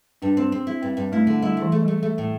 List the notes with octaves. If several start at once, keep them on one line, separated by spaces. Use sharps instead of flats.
G2 D4
C4
C4
E4
G2 C4
G2
A3 E4
D3
G3 E4
A3
E3
A3
G3
A3
A3
A2